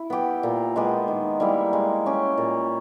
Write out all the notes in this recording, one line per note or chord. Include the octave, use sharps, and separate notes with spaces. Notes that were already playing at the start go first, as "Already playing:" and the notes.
Already playing: E4
B3 G4
A#2
G#3 B3 G4
D#3
G3 A#3 E4
G#3
C#4 G4
A#2